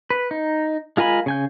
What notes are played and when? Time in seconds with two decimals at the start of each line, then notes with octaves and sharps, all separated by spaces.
0.10 B4
0.31 D#4
0.97 G#3 F4 A#4 G#5 B5
1.26 C#3 G#5 G6